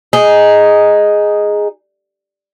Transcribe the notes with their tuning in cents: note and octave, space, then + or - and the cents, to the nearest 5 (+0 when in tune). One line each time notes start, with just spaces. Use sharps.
D#4 +0 G#4 +0